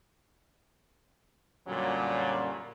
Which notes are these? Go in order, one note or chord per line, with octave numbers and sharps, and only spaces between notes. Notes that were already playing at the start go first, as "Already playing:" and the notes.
F#2 A#2 D3 F#3 G3 C#4